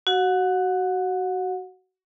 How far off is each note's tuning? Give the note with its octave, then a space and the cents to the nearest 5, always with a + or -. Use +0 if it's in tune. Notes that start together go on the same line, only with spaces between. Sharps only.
F#4 +20 F#5 -30